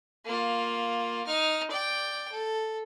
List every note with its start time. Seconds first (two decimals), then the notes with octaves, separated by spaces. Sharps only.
0.25 A#3 F4
1.26 D#4 F6
1.70 D5 G5
2.32 A4